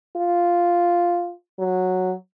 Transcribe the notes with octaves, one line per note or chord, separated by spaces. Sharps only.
F4
F#3